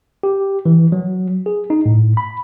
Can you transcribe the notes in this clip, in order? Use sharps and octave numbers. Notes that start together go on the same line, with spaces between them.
G4
E3
F#3
G#4
D#4
A2
B5